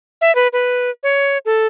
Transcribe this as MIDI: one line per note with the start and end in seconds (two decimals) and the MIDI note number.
0.21 0.34 76
0.35 0.48 71
0.53 0.90 71
1.03 1.38 73
1.46 1.67 69